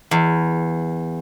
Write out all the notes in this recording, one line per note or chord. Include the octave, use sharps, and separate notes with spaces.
E2